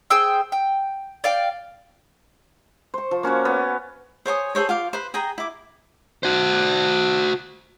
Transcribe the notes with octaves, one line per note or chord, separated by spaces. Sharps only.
G#4 C5 G5 E6
G5
D5 F5 G5
C5 C#6
F3
A#3 C#4 F#4 C#5
B3
C5 C#5 G#5 D#6
G#4 A4 C5 C#5
F4 F5 D6
B4 C5
G#4 G5 G#5 A#5
E4 D6
F#4 C5